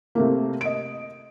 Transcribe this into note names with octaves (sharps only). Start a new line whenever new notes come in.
C3 A3 A#3
D#5 D7